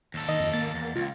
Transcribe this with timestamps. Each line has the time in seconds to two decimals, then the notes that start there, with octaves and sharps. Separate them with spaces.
0.14 D#2 A4
0.29 D#3 D#5
0.40 F2
0.54 A#3 A6
0.74 E2
0.96 C#2 F4